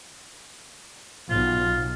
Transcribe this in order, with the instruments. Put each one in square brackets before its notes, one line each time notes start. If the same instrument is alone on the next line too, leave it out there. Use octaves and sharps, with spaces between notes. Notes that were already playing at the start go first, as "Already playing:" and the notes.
[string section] B1 [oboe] F4